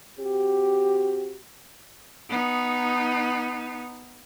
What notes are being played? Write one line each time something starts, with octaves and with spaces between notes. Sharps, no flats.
C4 F#4 G4
B3 D#4